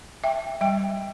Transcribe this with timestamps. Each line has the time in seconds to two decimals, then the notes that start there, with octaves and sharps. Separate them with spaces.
0.24 E5 G5
0.61 G3 E5 G5